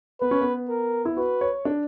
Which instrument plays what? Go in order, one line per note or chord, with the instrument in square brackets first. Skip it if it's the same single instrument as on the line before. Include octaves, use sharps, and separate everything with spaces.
[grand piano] B3 [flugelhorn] B4
[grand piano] C#4
B3
[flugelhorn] A#4
[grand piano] E4
[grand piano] F#4 [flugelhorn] B4
[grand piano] C#5
D4